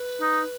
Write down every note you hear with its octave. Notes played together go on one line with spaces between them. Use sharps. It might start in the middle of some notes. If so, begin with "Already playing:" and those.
Already playing: B4
D#4